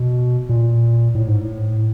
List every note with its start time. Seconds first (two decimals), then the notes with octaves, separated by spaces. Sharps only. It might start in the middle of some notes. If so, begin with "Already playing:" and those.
Already playing: B2
0.49 A#2
1.15 A2
1.28 G#2
1.41 A2